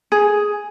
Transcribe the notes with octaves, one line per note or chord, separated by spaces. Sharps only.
G#4